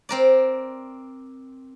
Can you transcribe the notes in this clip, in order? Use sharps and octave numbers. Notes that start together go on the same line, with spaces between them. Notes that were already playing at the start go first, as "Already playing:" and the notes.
C4 A#4 D5